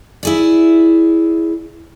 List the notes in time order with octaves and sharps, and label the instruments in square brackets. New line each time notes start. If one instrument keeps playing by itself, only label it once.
[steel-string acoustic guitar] E4 G#4 D5